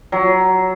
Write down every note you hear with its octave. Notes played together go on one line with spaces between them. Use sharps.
F#3